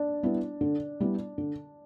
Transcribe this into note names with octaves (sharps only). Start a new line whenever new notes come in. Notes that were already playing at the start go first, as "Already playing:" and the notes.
Already playing: D4
G3 B3 E4
D3
G3 B3 E4
D3